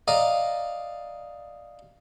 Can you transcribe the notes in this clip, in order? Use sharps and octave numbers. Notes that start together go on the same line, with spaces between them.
D5 D#5 F5 A#5